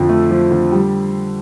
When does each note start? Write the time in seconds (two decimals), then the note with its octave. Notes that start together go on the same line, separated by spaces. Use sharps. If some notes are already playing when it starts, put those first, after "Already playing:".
Already playing: F2 D3 F3
0.09 A3
0.30 F3
0.51 D3
0.72 G3